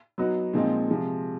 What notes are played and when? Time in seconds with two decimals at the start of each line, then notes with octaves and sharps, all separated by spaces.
0.18 F#3 B3 D#4 F#4
0.53 A#2 F3 G#3 C4 D#4
0.90 C3 F3 G#3